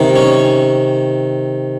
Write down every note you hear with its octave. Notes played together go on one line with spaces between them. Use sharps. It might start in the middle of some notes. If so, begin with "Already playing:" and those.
Already playing: C3 D#3
C#4